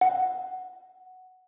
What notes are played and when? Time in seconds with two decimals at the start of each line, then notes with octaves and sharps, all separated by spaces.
0.01 F#5